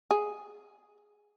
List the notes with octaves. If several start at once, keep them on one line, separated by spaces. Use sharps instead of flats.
G#4